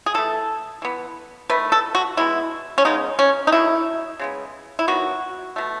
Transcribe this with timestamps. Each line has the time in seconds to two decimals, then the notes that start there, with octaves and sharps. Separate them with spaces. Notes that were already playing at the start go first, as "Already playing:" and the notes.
0.06 G#4
0.14 E3 A3 A4
0.82 E3 B3
1.50 D#3 A3 B4
1.72 A4
1.95 F#4
2.17 B2 G#3 B3 E4
2.78 C#4
2.85 C#3 G#3 B3 D#4
3.19 C#4
3.47 D#4
3.52 D#3 F#3 A3 E4
4.19 C#3 G#3 B3
4.79 E4
4.88 D#3 F#3 B3 F#4
5.56 B2 A3